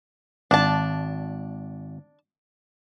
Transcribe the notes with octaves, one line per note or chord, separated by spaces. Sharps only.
G#1 D4 A5